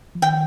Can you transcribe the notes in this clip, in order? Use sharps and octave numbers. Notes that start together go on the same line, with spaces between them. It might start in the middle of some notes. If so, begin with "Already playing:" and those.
F3
D#3 G5